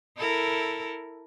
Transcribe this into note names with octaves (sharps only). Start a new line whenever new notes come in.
E4 A4 A#4